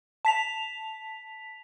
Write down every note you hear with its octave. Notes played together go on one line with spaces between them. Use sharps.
A5 B6 F7